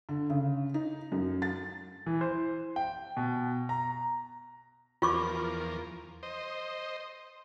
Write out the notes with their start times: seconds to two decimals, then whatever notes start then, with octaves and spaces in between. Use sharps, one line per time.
0.09 D3
0.30 C#3
0.74 D#4
1.12 F#2
1.42 A6
2.06 E3
2.21 C5
2.76 G5
3.17 B2
3.69 A#5
5.02 E2 F3 F4 A#4 C#6 D6
6.23 C5 D#5